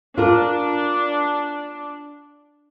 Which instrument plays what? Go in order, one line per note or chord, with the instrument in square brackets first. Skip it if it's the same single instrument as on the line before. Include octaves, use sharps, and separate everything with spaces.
[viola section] D4 [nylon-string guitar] F4 A#4